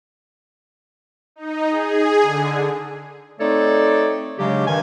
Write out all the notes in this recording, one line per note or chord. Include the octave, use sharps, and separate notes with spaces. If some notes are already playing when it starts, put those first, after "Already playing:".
D#4
G#4
D3
A3 C4 D#4 A4 C#5 D5
C#3 F#3 G#3 D4 G4
G2 D#3 G#5